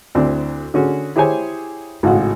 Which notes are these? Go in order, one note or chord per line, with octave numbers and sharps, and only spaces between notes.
D2 C4 D4 E4
D3 C#4 F#4 G#4
E4 G4 G#4 C5 C#5 G#5
G#1 A2 C#3 G#3 F#4 F#5